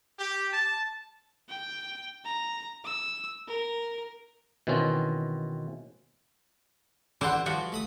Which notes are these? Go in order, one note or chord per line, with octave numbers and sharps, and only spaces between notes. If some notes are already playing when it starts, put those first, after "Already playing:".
G4
A5
G5
A#5
E6
A#4
B2 D#3 E3 C4 C#4
D3 E3 D4 G4 C5 F#5
E3 F3 G3 F#4
A3 B5 D#6